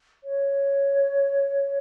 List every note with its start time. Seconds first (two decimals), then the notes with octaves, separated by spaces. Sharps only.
0.24 C#5